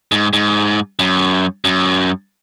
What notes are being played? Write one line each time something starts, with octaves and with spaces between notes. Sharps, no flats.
G#2
G#2
F#2
F#2